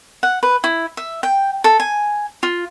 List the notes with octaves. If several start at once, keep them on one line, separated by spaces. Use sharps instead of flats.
F#5
B4
E4
E5
G5
A4
G#5
F4